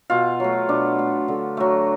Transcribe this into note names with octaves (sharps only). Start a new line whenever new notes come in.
B2 F4
F#3 A3
B2 D4
A3
D3
F#3 A3